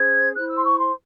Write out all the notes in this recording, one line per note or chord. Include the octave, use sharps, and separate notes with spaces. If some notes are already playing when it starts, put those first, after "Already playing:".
Already playing: C#4 G#4 C5 G#6
E4 C5 F#6
E6
C6
C#6
C6